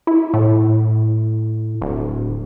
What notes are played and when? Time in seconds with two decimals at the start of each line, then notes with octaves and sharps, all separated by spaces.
0.07 E4
0.34 A2
1.82 D1